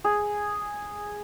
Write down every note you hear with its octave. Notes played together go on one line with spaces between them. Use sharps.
G#4